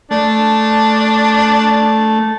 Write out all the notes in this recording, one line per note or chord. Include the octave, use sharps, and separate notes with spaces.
A3 D4